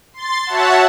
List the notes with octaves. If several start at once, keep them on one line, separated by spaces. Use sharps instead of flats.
C6 A6
F#4 C#5 E5 F#5 A5